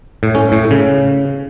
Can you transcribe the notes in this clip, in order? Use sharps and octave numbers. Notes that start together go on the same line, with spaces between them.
A2
C#4
A2
C#3